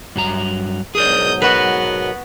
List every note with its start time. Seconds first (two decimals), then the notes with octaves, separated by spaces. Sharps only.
0.16 G2 F#3 A#5
0.95 G#2 B2 F#3 G#4 A#4 D5 D#6 G6
1.42 B3 F#4 A#4 B4 F#5